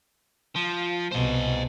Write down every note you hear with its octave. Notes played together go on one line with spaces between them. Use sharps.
F3
C2 B2 C5 D#5